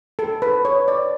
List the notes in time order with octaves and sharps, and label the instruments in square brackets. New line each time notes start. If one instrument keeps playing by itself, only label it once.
[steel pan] A4
B4
C#5
D5